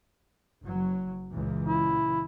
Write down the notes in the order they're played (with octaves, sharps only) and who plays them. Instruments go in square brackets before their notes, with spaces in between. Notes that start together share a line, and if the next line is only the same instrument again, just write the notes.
[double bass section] F#1 F#3
C#2 A#2 E3
[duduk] E4